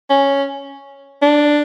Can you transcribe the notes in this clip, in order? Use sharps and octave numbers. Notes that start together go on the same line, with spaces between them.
C#4
D4